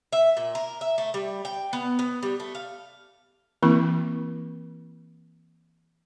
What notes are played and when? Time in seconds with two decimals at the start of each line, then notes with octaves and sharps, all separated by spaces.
0.12 E5
0.37 A#2
0.55 A#4
0.81 E5
0.98 A3
1.14 G3
1.45 G5
1.73 B3
1.99 B3
2.23 G3
2.40 A3
2.55 F5
3.63 E3 A#3 C4 E4 C#6